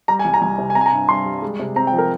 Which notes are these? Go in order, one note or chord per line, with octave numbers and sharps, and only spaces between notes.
G3 A#5
G#5
C2
A#5
C2 G#5
C3
G#5
C4 A#5
G#5
A#5
G2
G2 C6
G3
G#3
C3
C4 A#5
G5
F3
A#4